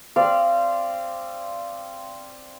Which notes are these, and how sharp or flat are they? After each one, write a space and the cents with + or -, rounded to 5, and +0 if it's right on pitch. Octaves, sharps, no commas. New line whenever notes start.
C4 +0 D5 +0 F5 -25